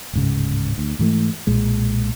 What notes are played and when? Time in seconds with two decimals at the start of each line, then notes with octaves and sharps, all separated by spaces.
0.13 D1 G#2 C#3
0.78 D2
0.99 G#2 E3 G3 A3
1.47 B1 A#2 G#3